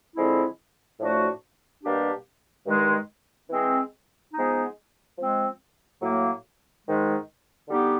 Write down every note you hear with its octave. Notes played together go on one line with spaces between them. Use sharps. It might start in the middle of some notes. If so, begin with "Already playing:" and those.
D3 F3 G#3 C4 E4
A2 F3 A3 D4 F#4
B2 G3 A#3 D4 G4
G2 D#3 G#3
E3 G#3 C4
F3 G#3 B3 D#4
F3 G#3 C4
A2 F#3 A#3
G#2 D#3 G#3
D3 G3 B3 D#4 G4